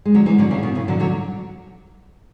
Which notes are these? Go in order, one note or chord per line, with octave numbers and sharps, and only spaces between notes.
G#3
D3 F#3
E3 G#3
D3 F#3
C#3 E3
B2 D3
C#3 E3
D3 F#3
D3 F#3